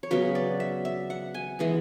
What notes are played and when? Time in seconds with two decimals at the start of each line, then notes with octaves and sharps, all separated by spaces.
0.03 C#5
0.11 C#3 F#3 B3 B4
0.35 D5
0.60 E5
0.85 E5
1.10 F#5
1.34 G#5
1.59 E3 G#3 B3